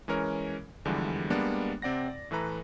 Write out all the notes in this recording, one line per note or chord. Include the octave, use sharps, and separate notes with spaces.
E3 G#3 C#4 A#4 C#5
E2 D3 E3 F3 G3 G#3
G3 G#3 A#3 B3 D4
C3 C4 D5 F#5 A#6
D5
A2 E3 A4 B4 A#5